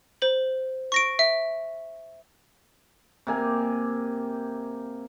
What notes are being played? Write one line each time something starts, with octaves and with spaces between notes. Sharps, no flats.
C5 F#7
C#6 A#6 D7
E5
C3 A#3 G#5